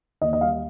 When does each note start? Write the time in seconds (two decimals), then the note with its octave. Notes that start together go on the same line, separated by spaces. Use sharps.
0.21 D#2 D#5
0.33 D#5
0.41 G3 F5